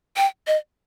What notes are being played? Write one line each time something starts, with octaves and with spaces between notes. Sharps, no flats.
G5
D#5